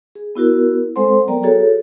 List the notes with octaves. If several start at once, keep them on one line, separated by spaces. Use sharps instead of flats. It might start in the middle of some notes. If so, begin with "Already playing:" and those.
G#4
B3 E4 F#4 A#4
G#3 C4 A4 C5 F#5 C6
F#3 B3 A#4 D5 G5 A#5
F#4 G#4 A4 C#5